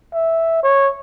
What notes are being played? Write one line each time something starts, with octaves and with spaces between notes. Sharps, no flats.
E5
C#5